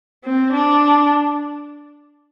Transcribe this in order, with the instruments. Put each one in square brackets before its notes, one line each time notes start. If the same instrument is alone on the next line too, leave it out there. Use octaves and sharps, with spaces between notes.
[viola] C4
D4